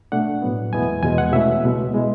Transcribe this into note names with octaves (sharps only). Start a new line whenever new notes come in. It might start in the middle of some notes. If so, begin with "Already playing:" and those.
B2 A3 D4 F#5
A2 F#3 B3
E2 B2 G#3 B3 E4 G#5
E2 B2 G#3 G#5
F#5
B2 A3 C#4 E4 E5
C#2 B2 G#3
G#3 B3 E4